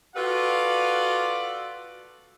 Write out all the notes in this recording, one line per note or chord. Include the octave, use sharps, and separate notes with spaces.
F4 F#4 A4 B4 D5 F5